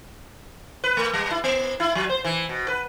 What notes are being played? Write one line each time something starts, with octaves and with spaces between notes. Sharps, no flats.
B4
A3
G3
E4
B3
E4
F#3
C5
E3
B2
B4